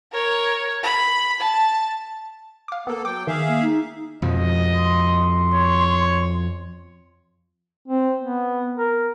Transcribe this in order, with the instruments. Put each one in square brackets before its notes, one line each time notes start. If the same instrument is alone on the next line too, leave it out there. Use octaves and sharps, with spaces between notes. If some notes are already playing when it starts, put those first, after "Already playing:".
[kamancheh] A#4 C#5
B5
A5
[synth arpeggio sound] F5 D6
[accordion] A#3 A4 [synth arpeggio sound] B3 A#4
[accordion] F#3 G5 [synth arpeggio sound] D6
[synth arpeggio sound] D#3 [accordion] G#4 E5 F5
[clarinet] A#3
D#4
[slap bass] F2 B2 F3 [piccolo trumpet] D#5
[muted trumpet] C6
[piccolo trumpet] C#5
[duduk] C4
B3
A#4